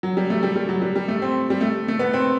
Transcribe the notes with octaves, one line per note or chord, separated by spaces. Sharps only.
F#3
G3
A3
G3
G3
F#3
G3
G3
A3
C4
G3
A3
A3
B3
C4